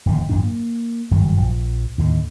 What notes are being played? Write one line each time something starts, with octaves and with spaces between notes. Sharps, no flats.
D1 D#2 C#3 F3
G#1 F#2 A#2 D4
A#3
F#1 G2 D#3 F#3
A#1 F3
D#2 A2 D3